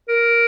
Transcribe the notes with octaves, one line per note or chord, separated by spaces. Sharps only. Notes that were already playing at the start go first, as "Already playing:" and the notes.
A#4